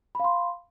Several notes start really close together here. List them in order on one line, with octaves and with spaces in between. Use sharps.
B5 F5 C6